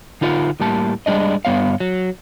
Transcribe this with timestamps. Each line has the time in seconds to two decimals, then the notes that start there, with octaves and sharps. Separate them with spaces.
0.21 D3 D#4 F4 A#4 C#5 F#5
0.60 A2 G3 A#3 A5
1.06 G3 G#3 D4 D#5
1.45 G2 F3 B3 C#5 F5
1.80 F#3